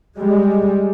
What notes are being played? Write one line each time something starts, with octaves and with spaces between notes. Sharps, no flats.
G3 G#3